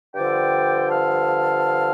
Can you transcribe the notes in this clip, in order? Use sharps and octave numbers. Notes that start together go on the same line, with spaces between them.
G2 D3 F3 D5 G5
F5 A5